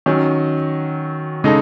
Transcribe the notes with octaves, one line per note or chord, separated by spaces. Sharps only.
D#3 F#3 C#4
C#3 G#3 D#4 A4